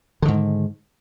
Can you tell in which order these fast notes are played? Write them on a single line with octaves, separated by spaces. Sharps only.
D3 D#3 G#2